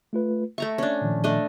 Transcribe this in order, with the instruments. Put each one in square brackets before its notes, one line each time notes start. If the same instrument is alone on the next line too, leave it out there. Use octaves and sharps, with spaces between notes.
[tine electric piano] A3 F4 B4
[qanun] A3 A#5 C#6 [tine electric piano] E5
[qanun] C#4 D4
[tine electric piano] A#2 D#3 F3
[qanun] A3 D4 D#5